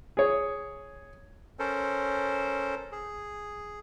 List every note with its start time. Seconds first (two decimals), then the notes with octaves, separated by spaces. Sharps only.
0.17 G#4 C#5
1.59 C#4 A4 A#4 C5
2.92 G#4